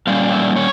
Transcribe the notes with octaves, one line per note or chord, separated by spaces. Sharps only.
A#2 G3 C#4 F5
E5
C#5